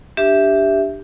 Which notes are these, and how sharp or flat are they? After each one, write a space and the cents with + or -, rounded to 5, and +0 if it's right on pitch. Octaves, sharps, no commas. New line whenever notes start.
D4 +0 G4 +5 E5 +0